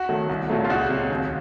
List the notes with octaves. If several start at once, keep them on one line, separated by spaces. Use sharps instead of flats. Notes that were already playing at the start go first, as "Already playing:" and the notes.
Already playing: F#4
D#3 F#3 A3
C2
A#2 F#3 A3
F4
C#2 F#4
C3 F#3
D#2